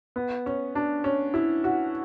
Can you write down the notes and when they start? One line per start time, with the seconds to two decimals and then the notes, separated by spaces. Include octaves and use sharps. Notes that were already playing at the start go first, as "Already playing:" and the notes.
0.16 B3
0.46 C#4
0.75 D4
1.04 C#4
1.34 E4
1.64 F#4